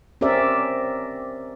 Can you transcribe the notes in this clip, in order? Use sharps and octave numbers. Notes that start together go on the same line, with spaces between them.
C4 C#4 G4 A#4 D5 E5